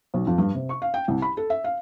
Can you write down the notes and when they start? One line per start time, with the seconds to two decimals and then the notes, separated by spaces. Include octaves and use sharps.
0.14 B1
0.27 F2
0.38 G2
0.54 C3
0.69 C#6
0.82 F5
0.94 G5
1.08 C2
1.22 B5
1.37 A4
1.50 E5
1.64 F5